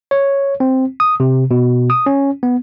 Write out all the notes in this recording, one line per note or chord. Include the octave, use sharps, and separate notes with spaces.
C#5
C4
D#6
C3
B2
D#6
C#4
B3